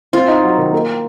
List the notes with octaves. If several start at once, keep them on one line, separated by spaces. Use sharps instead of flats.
C4 F4
D#4
F#3
D#3
A#3